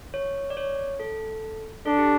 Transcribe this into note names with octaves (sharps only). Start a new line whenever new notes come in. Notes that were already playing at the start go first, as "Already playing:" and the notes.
C#5
D5
C#5
A4
D4 A4
G4